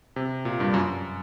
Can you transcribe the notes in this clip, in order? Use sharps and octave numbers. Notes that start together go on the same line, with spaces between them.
C3
A#2
G2
F#2